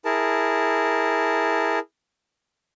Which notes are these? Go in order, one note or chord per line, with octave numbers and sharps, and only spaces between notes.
E4 G#4 A#4 A5